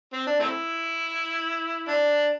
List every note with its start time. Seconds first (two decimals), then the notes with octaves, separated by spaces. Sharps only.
0.13 C4
0.27 D4
0.40 A3 C4 E4
1.88 D4